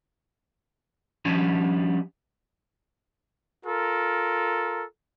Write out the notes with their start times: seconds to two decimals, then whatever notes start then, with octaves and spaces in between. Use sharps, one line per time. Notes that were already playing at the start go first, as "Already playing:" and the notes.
1.25 F3 G3 C#4 D4
3.65 F4 A4 A#4